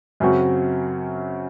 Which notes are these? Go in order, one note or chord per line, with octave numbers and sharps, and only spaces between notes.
F#2 C#3 F#3 C4 F#4